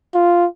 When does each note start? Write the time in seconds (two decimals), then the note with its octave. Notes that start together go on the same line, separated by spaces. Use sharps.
0.14 F4